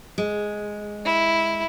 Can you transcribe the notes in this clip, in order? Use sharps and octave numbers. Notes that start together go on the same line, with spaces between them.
G#3
E4